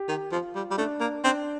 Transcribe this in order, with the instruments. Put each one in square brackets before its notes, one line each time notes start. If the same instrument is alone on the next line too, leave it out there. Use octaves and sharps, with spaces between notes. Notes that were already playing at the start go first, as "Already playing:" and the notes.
Already playing: [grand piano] G4
[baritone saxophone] D#3
[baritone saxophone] F3 [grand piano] F4
[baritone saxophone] G3
G3
[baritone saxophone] A3 [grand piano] D4
[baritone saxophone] A#3
[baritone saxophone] C4 [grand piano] D4